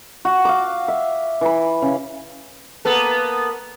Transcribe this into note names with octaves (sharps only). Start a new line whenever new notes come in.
F#4
F5 D6
E5
E3 B5
C#3
A#3 B3 A4